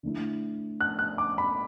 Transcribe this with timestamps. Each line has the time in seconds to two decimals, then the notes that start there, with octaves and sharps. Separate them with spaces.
0.03 D3 A3 E4
0.81 F#6
0.99 F#6
1.18 D6
1.38 B5